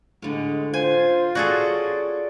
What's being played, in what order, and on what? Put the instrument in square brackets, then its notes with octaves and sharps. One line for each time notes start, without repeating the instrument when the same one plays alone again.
[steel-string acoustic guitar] A2 D3 [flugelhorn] G#3
[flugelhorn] F4 [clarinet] C5 [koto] G#5
[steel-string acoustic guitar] C#4 [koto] F#4 G#4 A4 [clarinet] D5